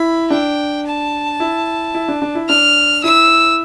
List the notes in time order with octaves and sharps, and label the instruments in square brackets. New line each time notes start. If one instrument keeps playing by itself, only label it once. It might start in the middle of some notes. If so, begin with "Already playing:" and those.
Already playing: [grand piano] E4 [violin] B5
[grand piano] D4 [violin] G5
[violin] A5
[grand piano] E4
E4
D4
D4
E4
[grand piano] D4 [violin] F6
[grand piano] E4 [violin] E6